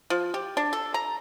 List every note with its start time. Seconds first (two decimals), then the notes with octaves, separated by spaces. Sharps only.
0.10 F3
0.34 G4
0.57 D4
0.73 A4
0.94 A#5